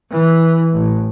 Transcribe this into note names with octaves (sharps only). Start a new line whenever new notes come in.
E3
A1